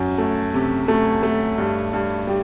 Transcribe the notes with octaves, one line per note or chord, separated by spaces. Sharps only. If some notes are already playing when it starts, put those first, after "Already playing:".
Already playing: F#2
A3
C3
A3
A3
G2
G2
G3